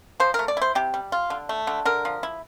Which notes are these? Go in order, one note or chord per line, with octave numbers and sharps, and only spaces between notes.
F3 C5
A#4
A3
D5
E4 C5
C3 G4
G3
F4
D3
A3
D3
D3 A#4
F3
E4